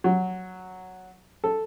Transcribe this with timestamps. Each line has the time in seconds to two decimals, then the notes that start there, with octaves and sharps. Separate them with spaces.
0.04 F#3
1.44 A4